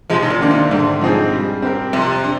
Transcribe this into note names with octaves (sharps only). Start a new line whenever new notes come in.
C3 F3 G#3
G#2
A#2
D#3 A#3 D4
C3
G#2 D3
F3 C4 D#4 G#4
G3
C4 G4 A#4
F2 C3
D4